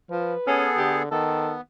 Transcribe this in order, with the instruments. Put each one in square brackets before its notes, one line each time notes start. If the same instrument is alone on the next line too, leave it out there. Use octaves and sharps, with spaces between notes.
[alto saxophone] F3 [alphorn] B4
[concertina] B3 G#4 A4 [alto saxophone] C#4
[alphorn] D3 [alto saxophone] G4
[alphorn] D#3 [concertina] B3 [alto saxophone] A4